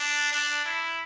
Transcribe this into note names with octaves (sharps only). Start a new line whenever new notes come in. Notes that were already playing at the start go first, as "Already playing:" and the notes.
Already playing: D4
D4
E4